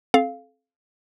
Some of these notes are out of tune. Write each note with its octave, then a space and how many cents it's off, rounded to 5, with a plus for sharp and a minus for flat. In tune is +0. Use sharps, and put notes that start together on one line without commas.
C4 +10 A4 -30 F5 +0